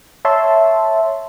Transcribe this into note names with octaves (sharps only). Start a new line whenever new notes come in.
C#5 E5 A5 C6